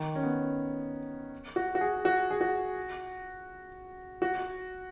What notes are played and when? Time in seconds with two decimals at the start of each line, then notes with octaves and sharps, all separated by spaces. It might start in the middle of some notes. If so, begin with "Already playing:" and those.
Already playing: D#3
0.15 C#4
0.23 B3
1.56 F#4
1.75 F#4
1.81 G#4
2.05 F#4
2.31 G#4
2.41 F#4
4.22 F#4